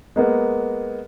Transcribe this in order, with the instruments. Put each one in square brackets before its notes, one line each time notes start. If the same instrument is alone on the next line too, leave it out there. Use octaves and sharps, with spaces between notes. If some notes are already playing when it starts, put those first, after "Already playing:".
[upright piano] G#3 A#3 B3